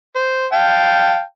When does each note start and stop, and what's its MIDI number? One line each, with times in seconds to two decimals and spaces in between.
0.16 0.47 72
0.53 1.21 77
0.53 1.21 79
0.53 1.21 81